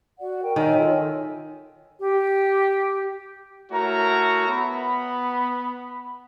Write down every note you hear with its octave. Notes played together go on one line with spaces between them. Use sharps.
F#4 D5 F#5
A#4 G5
D#3 C#5 E5 G#5
F4 A4 C#5
G4
A3 E4 F#4 A#4 C#5 A#5
B3 B5